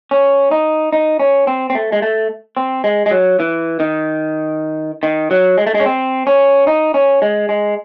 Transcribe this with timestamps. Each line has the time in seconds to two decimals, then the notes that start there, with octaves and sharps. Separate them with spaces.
0.11 C#4
0.51 D#4
0.93 D#4
1.20 C#4
1.47 C4
1.70 C4
1.75 A3
1.92 G#3
2.02 A3
2.57 C4
2.84 G#3
3.06 G#3
3.11 F#3
3.40 E3
3.80 D#3
5.03 D#3
5.31 F#3
5.58 G#3
5.67 A3
5.75 G#3
5.80 C#4
5.86 C4
6.27 C#4
6.67 D#4
6.94 C#4
7.22 G#3
7.49 G#3